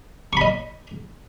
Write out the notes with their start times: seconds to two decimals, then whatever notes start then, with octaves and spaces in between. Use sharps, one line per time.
0.33 C#6
0.37 B5
0.41 D#5